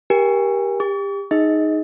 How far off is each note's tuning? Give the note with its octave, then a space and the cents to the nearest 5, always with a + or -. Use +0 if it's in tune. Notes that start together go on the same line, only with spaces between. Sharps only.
G4 +0 A#4 +25 G#5 -25
G4 +30 C#6 +45
D#4 +0 G#4 +0 D#5 +25